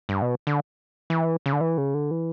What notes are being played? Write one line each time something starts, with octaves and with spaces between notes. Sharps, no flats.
G2
B2
D3
E3
C#3
D3
E3
C#3
D3
E3